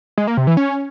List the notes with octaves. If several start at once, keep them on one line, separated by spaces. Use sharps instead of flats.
G#3
A#3
C3
E3
C#4